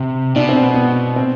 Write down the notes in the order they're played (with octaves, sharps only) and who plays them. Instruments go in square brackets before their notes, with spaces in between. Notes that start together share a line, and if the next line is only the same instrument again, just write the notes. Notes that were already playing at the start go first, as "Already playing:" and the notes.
Already playing: [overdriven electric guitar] C3 [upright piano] C4
[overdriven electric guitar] B2 [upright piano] D4
[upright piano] C4
B3
B3
C4